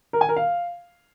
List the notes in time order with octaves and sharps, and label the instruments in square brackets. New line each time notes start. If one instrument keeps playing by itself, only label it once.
[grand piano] A#4
G#5
A#4
F5